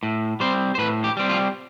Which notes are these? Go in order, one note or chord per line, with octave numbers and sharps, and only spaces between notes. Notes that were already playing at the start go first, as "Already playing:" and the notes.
A2
G3 C4 C5
C5
A2 B4
G4
G3 C4
F4